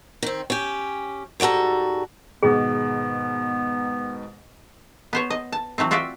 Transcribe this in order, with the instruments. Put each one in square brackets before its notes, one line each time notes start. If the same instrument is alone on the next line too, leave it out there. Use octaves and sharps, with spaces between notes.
[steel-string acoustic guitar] D#3 C4
C#4 G4
G#2 G3 F#4 A4 A#5
[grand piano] G#2 B2 D#3 [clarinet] B3 [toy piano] G#4
[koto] B3 C5 C#5
D#5
A5
E3 F#3 A3 C4
F4 F#4 D5 E5 G5